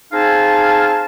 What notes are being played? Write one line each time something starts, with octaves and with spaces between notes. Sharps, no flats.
C4 D#4 G#4 F5 G#5 A5